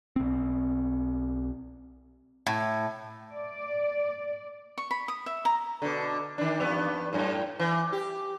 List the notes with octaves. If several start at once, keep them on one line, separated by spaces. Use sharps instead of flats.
B1 C4
A2
D5
C#6
B5
D#6
E5
A#5
B2 D3
D#3 D4
E2 G2 B3
F#2 A2
E3
G4